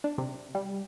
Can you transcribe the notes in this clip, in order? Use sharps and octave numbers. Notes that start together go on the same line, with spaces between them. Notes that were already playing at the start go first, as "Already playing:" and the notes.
D4
C3
G3